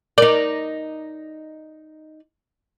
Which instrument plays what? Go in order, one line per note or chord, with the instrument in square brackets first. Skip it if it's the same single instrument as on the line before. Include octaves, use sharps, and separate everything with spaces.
[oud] D#4 D5 [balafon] A#4